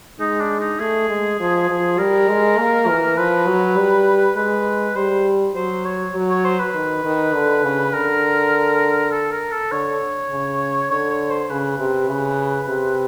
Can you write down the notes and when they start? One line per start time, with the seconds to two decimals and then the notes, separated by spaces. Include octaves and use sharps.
0.20 G#3 D#4
0.40 D4
0.60 D#4
0.80 A3 G#4
1.09 G#3
1.40 F3
1.69 F3
1.99 G3 A#4
2.29 G#3
2.58 A#3
2.88 E3
3.17 F3 B4
3.47 F#3
3.77 G3
4.36 G#3 B4
4.96 G3 C5
5.55 F#3 C5
5.85 C#5
6.15 F#3
6.30 C#5
6.45 C5
6.60 B4
6.74 D#3
7.04 D#3
7.34 D3
7.64 C#3
7.93 D3 A#4
9.12 A4
9.32 A#4
9.52 A4
9.72 D3 C#5
10.31 C#3
10.90 D3 C#5
11.10 C#5
11.30 C5
11.50 C#3 B4
11.79 C3
12.09 C#3
12.68 C3